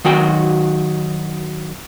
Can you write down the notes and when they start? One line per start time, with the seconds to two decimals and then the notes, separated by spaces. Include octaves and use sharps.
0.05 D#3 F#3 F#4 G5